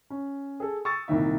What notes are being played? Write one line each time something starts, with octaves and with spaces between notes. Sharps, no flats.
C#4
G#4 A4
C#6 D#6 E6 A6
C2 A#2 D#3 E5